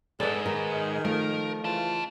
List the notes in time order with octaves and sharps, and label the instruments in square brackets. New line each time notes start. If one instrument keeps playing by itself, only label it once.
[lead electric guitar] B1 G#2 [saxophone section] D4 A4 [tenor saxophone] G#4 [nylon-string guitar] B4 D5
[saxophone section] D#3 [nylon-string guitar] A#4 B4
[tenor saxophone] F3 [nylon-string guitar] A3 [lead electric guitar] A#4
[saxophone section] C#3 F4 [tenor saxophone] E3 [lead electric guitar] D#5 A5